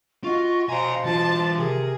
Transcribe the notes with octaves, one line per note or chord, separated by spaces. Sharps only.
F4 F#4 D#5 C#6
B2 C5 F5 G#5 A#5 C6
E3 F4 A5
C3 G#4 A#4